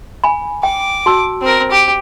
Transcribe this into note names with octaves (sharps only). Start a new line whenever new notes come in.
G#5 B5
G5 D6
F#4 A5 E6
C4 A#4
G4